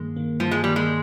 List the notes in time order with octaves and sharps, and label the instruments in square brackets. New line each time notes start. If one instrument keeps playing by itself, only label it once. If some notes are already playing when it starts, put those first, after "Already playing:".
Already playing: [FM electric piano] G2 D#3 A#3 [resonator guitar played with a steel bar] G#3
[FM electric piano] D#3 A#3
[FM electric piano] G2 [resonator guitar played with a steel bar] F3
[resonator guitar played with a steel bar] G#3
[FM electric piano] D#3 A#3 [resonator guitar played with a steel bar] G3
[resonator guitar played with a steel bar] G#3